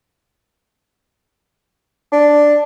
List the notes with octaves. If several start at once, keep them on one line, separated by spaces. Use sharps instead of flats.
D4